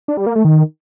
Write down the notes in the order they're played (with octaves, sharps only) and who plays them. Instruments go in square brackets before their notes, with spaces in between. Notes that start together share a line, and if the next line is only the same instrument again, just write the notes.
[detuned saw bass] D4
G3
A#3
A3
D#3